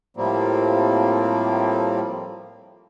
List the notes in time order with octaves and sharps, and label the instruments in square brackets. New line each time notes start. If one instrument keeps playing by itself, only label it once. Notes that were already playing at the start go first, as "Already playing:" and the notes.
[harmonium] A2 F3 G3 A#3 C4